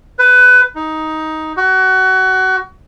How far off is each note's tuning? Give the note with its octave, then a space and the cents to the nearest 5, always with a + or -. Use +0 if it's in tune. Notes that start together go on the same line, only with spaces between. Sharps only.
B4 +20
D#4 +10
F#4 +25